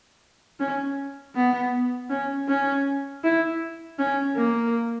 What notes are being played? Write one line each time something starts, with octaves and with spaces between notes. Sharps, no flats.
C#4
B3
C#4
C#4
E4
C#4
A#3